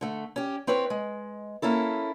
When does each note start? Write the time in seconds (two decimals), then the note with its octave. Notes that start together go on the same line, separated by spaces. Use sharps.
0.01 D3 A3
0.36 C#4 G4
0.67 C4 E4 B4 C#5
0.90 G#3
1.62 A#3 C#4 E4 A4